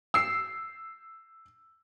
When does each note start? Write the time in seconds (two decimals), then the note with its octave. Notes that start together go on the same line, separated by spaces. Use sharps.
0.14 E6 C7